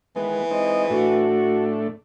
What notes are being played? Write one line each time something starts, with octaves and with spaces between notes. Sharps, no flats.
D#3 E3 G#3 B3
G#3 C4 D#4 D#5
A2 A3 D4 F#4